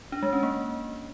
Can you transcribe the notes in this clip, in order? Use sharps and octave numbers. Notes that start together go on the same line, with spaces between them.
D4
G#3
C#4
A#3